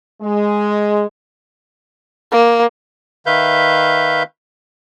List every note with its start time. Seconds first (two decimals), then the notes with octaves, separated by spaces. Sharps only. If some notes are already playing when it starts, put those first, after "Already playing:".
0.22 G#3
2.32 A#3
3.26 D#3 B4 E5 F5 G6